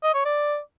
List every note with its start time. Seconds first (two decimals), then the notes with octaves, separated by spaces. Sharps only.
0.03 D#5
0.14 C#5
0.25 D5